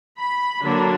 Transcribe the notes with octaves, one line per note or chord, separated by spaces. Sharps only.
B5
D3 F#3 A#3 D4